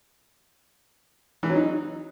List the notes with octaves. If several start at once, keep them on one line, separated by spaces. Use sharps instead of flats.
E3
F#3
D#4